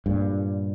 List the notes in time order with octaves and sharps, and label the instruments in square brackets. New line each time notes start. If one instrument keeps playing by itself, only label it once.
[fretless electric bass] G2 A#2